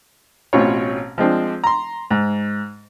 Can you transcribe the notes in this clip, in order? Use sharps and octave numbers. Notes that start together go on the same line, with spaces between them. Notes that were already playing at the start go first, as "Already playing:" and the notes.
A1 B2 C4 C#4 F4 C#5
F3 G#3 C4 D4
A#5 C6
G#2